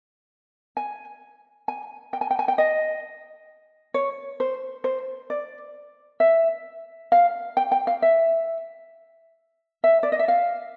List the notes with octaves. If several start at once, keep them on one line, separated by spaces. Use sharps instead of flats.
G#5
G#5
G5
G#5
G5
G#5
G5
D#5
C#5
C5
C5
D5
E5
F5
G5
G5
F5
E5
E5
D5
D#5
E5
F5